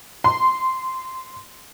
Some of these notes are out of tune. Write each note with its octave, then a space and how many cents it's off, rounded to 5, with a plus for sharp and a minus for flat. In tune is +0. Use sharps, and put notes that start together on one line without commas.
C6 -10